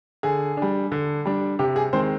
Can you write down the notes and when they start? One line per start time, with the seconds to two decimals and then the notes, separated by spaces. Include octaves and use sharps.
0.23 D3 G#4
0.57 G3 D4
0.92 D3
1.25 G3 D4
1.59 C3 G4
1.76 G#4
1.93 D#3 G#3 C4 C5